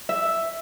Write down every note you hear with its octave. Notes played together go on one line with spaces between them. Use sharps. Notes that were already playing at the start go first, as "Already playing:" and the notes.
E5